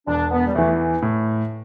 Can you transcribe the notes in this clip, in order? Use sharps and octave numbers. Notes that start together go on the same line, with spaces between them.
E1 D4
B3
G3
E2 E3 A3
A2